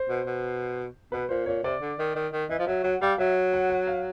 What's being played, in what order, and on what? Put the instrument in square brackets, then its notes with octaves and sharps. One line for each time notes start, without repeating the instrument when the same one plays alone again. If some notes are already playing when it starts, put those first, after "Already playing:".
Already playing: [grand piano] C5
[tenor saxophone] B2
B2
[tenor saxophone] B2 [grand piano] B4
[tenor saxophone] A#2 [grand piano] C5
[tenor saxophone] A#2 [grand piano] C#5
[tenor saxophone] C3 [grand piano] D5
[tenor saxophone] D3
D#3
D#3
D#3
[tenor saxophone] E3 [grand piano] D#5
[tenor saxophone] F3
[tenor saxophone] F#3 [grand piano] E5
[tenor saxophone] F#3 [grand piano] F#5
[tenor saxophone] G3 [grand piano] F5
[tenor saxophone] F#3 [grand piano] E5
[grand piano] F#5
F#5
F5